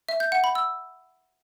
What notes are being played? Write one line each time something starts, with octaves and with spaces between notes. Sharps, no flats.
E5
G6
F#5
B5
E6